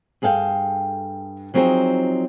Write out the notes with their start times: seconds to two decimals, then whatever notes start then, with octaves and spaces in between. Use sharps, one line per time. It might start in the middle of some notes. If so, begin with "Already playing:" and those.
0.22 G2 G#4 A4 F5 G5
1.54 F3 F#3 C4 D#4 G#4 C5